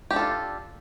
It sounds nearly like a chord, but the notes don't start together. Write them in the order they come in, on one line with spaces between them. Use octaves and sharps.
G4 D4 A4 F4